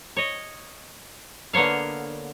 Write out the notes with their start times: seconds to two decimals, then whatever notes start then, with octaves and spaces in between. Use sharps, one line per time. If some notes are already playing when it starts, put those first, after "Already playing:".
0.17 C#5 D#5
1.53 D3 A#3 B3 C#5 F5